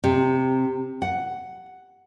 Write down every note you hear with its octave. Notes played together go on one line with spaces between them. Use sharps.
C3
F#5